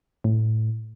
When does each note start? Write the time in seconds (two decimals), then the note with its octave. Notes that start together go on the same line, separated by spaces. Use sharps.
0.24 A2